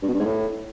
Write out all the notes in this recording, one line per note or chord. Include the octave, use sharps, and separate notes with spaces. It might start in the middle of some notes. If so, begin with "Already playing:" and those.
G2
B2
G2
G#2
A2